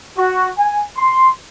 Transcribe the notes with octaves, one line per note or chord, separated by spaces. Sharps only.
F#4
G#5
C6